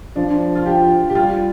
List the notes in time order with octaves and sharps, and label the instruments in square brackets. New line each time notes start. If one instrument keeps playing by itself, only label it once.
[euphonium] F3 [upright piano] D4
[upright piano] F4
G4
G4
[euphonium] G3 [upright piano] F4